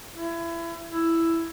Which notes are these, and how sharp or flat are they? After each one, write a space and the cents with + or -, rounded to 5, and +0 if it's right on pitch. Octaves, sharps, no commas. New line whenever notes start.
E4 +30
E4 +5